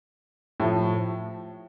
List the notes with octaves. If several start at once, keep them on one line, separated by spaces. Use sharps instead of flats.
A2 F3 A3